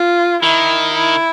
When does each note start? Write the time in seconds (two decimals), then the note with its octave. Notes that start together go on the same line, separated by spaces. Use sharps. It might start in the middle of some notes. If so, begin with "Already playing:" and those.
Already playing: F4
0.42 D#3 E4
0.94 E4